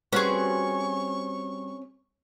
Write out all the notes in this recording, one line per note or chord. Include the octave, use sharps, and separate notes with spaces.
G3 C4 C#4 F#4 G#4 B4 C#6